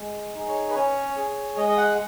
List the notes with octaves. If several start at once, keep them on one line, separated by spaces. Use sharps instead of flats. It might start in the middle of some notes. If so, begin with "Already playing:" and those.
Already playing: G#3
D#4 G#4
C#5
B4
C#4 C#5
G#4
G#3 D#5
D#5
F#5